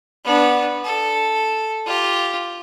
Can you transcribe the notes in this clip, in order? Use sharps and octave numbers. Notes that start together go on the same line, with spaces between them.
B3 D4
A4
F4 G4